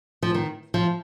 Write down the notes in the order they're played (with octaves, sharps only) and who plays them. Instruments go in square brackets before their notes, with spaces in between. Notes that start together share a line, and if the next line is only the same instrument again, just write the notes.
[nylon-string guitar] F3
D#3
F3